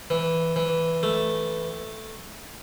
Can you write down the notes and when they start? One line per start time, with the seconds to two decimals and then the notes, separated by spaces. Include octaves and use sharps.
0.10 E3
0.56 E3
1.03 A3